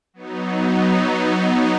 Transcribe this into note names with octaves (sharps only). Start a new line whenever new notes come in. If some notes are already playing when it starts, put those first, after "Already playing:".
F#3 B3 D#4